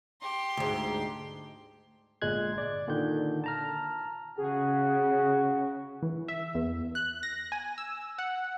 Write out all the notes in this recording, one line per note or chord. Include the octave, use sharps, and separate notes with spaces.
G4 C6
D2 G#2
G1 A#2 G#3 F#6 G#6
D5
A#2 D3 D#3 G6
A5 A#5 F6
C#3 F#4 G#4
E3
E5
E2
F#6
A#6
G#5
E6
F#5